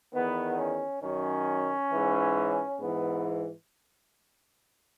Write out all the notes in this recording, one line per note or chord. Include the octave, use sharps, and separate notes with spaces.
E2 D#3 B3
C#4
F#2 D#3 C#4
G#2 E3
G#2 E3 B3